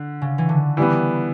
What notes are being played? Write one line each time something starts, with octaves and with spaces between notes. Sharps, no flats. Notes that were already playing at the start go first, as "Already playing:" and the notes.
Already playing: D3
C#3
E3
D3
E3 G3 B3